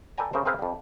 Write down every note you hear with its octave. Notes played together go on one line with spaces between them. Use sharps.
A4 B4 D5 G5 G#5 A#5
C#3 A3 A#4 C5
C4 G#4 A#4 B4 F5
F2 G3